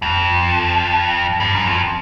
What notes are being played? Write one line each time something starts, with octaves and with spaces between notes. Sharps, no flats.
F2
G2
F#2
F2